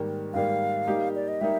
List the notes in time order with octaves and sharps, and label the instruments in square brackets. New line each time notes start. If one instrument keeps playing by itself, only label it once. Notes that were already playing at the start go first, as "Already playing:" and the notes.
Already playing: [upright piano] G#2 D#3 G3 A#3
[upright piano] G#2 D#3 G3 A#3 [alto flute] F5
[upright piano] G3 A#3 D#4 G4
[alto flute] D5
D#5
[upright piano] G3 A#3 D#4 [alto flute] E5